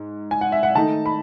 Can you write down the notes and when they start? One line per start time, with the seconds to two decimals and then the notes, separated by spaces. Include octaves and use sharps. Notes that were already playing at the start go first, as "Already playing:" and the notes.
Already playing: G#2
0.31 G#5
0.41 F#5
0.52 E5
0.63 F#5
0.75 D#3 A3 D#4 A5
1.06 B5